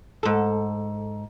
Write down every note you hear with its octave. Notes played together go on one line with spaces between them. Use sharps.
G#2 A4